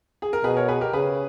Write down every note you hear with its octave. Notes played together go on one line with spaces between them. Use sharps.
G#4
A#4
B2 G#4 B4
A#4 C#5
G#4 B4
G4 A#4
C#3 G#4 B4